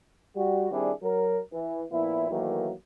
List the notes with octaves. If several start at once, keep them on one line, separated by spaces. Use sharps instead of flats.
G3 F#4
D#3 G3 C4 D4 E4 G#4
F#3 A#4
E3
A#2 F3 B3 E4
D#3 E3 F#3 A3 A#3